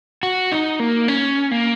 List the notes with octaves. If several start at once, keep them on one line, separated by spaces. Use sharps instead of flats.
F#4
D#4
A#3
C#4
A#3